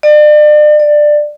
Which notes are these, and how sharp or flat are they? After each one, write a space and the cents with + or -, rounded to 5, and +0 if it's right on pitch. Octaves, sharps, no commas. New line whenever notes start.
D5 +40
D5 +15